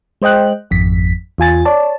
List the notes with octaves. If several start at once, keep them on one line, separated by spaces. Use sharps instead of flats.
G#3 C5 D#5 G5 F#6
G#1 F2 B6
E2 F4 G#5 A6
C#5 D5 A5